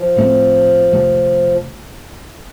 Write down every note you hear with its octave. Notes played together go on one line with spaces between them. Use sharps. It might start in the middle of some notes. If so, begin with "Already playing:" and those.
Already playing: F3
A2 A3 C4
F2 C3 D#3 A3